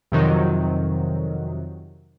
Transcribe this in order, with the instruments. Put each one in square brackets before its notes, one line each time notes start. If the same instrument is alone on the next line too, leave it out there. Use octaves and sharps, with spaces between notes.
[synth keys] F2 C3 D#3 F#3